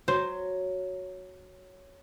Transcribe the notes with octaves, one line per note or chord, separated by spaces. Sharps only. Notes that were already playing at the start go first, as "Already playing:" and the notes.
F#3 C5